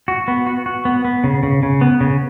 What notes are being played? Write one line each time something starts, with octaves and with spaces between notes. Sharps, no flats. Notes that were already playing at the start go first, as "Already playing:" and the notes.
F#4
B3
F#4
F#4
B3
B3
C#3
C#3
C#3
B3
C#3